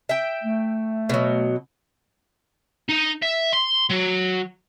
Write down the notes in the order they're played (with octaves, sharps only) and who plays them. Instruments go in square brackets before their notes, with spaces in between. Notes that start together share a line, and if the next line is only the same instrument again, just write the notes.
[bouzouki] E5 G5
[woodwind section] A3
[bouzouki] B2 F#3
[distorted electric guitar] D#4
E5
C6
F#3